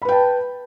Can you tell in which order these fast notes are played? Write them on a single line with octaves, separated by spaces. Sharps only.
B5 B4 G5 A5